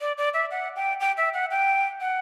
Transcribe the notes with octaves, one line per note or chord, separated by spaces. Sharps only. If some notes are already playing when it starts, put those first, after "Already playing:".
D5
D5
E5
F#5
G5
G5
E5
F#5
G5
F#5